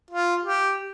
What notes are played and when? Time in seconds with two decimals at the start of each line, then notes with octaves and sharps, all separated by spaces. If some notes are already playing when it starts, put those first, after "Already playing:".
0.11 F4
0.43 G4